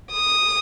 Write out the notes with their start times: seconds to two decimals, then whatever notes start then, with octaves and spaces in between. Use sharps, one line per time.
0.11 D#6